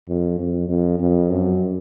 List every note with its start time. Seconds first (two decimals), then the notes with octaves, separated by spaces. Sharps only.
0.09 F2
0.39 F2
0.69 F2
0.99 F2
1.29 F#2